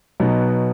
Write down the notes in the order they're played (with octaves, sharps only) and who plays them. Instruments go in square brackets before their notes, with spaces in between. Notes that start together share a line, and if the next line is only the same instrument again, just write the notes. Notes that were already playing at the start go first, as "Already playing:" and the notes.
[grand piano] B2 F#3 B3 D#4